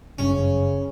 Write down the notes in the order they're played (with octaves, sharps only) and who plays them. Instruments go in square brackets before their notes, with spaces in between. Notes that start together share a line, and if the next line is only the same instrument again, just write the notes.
[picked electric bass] G1 F#2 [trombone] C#3 [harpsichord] C#4